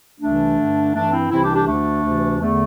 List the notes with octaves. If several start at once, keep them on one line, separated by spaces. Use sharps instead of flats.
C2 C3 E3 A3 D4
G2 D3
G2 E3 A3 D4
C4 E4
C2 C3 E3 C4 E4
D4 G4
D4 G4
D2 D3 A3 D4
D2 C3 E3
E2 D3 A3